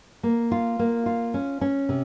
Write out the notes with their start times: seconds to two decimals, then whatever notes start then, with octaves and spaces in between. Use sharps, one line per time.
0.23 A#3
0.52 F4
0.79 A#3
1.06 F4
1.34 C#4
1.61 C#4
1.89 C3